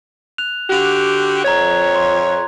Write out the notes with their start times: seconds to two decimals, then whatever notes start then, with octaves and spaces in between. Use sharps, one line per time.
0.38 F#6 F7
0.70 D3 F#4 G4 F#6 F7
1.45 F2 C#5 A#5 G#6
1.95 C6